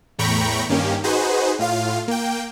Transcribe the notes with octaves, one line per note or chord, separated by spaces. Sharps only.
E2 A2 G5 A#5 B5 C#6
G2 D#3 A#3 C#4 G4
D#4 F#4 G#4 B4 C5
A2 F4 F5
A#3 G5